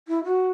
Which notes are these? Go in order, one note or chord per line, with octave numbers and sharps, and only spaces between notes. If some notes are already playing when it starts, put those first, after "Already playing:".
E4
F#4